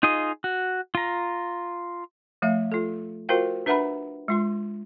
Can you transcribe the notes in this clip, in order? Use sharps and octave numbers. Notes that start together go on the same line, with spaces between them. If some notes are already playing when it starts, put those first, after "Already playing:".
D#4 F4 G#4 D#5
F#4
F4 A#5
F3 A3 E5 F5
F4 A4
F4 F#4 A#4 C5 F5 G5
D4 B4 E5 F#5 A#5 B5
G#3 F4 C6